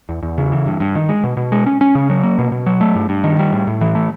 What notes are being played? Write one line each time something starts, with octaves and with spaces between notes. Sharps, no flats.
E2
E2
C#3
E3
G2
G2
D#3
G#3
B2
B2
G#3
C#4
C#4
C#3
F#3
A#3
B2
B2
F#3
A3
G2
G2
D#3
G3
A2
A2
E3
A3